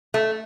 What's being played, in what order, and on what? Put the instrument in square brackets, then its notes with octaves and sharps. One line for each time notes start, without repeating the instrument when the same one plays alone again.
[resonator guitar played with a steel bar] A3